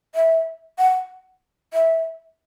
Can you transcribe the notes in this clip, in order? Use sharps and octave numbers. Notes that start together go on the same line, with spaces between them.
E5
F#5
E5